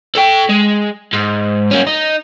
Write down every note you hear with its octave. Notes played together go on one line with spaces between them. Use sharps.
A4 G5
G#3
G#2
A#3 C#4
D#4